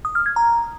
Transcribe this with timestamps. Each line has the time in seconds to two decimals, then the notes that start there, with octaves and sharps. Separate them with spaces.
0.05 D#6
0.15 F6
0.26 G#6
0.36 A#5